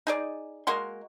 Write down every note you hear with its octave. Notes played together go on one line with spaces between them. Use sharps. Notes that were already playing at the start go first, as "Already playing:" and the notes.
D#4 G#4 D5
G#3 A#3 F#4 C6